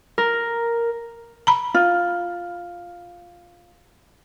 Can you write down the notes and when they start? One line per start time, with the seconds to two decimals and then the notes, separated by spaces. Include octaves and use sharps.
0.18 A#4
1.47 A#5 B5
1.74 F4